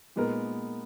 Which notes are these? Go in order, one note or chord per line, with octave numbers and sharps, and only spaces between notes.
A#2 G#3 B3 D#4 A#4